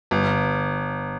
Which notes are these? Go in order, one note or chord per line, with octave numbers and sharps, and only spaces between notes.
G1